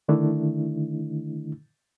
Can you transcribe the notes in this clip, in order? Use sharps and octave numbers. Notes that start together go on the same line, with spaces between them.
D3 D#3 A3 D4 E4